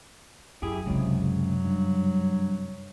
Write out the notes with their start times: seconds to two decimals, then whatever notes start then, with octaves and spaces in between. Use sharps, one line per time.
0.62 F#2 E4 G4 G#4
0.86 C#2 F#2 C3 F#3
1.65 G2